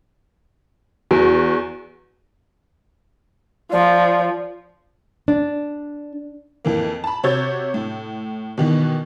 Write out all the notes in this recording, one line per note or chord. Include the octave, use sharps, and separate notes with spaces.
E2 F#4
F3 D5
D4
F2 E3 A#3
A5 B5
C3 F#4 C#5 E6 G6 A6
A2
B2 D#3 E3 B3